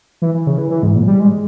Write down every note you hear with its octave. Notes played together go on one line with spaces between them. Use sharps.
E3
E3
C#3
E3
E3
G#2
A#2
F3
G3
G#3